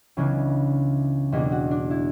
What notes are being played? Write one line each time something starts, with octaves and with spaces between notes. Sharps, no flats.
C#2 C#3 E3 B3 D4
E2 B2 A#3 D4 G4
F#4
D4
E4